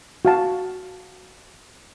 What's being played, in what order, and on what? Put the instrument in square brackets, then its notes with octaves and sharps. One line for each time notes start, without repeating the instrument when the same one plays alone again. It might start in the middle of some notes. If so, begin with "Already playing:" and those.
[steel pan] F#4 F5 A5